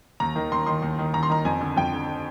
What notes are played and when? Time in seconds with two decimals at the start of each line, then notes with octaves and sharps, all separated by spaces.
0.20 D#2 A#5
0.36 D#3
0.52 D#2 C6
0.66 D#3 C6
0.82 D#2
0.99 D#3
1.14 D#2 A#5
1.23 C6
1.30 D#3 A#5
1.45 F2 G#5
1.61 D3
1.77 F2 G5
1.93 D3